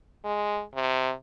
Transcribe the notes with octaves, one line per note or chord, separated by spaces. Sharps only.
G#3
C3